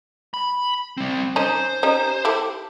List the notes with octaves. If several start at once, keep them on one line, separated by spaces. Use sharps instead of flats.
B5
G3 C4
D#3 C#4 D#4 C5
G3 C#4 D#4
E4 G4 A4